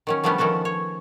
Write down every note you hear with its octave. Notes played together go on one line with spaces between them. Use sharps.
D#3 F#3 C#4
D3 F3 G3 A3 B3 C#4
D#3 F3 C#4 F#4 A4
C#5